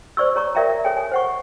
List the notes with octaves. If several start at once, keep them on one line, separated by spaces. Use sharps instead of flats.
C5 D5 C#6 E6
C#5 A#5 C#6
A#4 D5 E5 F5 G5 A#5
A4 C#5 G5 G#5
G#5
C5 F#5 C#6